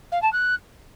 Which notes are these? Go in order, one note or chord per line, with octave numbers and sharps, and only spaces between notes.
F5
A5
F#6